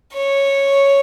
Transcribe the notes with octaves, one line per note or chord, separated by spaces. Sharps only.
C#5